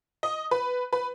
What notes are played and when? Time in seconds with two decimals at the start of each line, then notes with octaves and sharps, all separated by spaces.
0.23 D#5
0.51 B4
0.93 B4